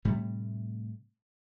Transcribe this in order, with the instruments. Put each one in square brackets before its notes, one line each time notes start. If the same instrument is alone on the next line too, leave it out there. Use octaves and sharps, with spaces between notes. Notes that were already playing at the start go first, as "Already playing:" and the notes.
[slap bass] A2 C3 G3 A3